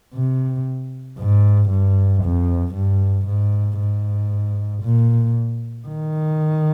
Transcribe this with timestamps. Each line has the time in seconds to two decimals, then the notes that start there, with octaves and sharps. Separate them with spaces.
0.14 C3
1.19 G#2
1.70 G2
2.24 F2
2.75 G2
3.27 G#2
3.79 G#2
4.83 A#2
5.88 D#3